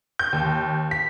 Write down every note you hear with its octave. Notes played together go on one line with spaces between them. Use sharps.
G6
D#2
B6